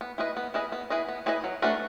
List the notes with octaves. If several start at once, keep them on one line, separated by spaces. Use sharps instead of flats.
B3
E4 G#4 B4 D#5
B3
E4 G#4 B4 D#5
B3
E4 G#4 B4 D#5
B3
E4 G#4 B4 D#5
F#3
A3 D4 F#4 B4